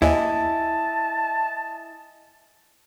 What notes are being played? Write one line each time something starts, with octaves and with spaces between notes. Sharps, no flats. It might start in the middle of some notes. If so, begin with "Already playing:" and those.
D#2 E4 D#5 G#5 A5